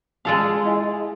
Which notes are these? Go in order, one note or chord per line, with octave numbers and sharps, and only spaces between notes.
G#3 F4 A4 F5 A5
E4 D#5 G#5